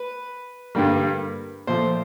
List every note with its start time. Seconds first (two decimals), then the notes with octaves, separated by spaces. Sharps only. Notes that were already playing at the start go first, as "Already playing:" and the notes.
Already playing: B4
0.75 G2 D3 G3 A#3
1.67 A#2 F3 A3 C5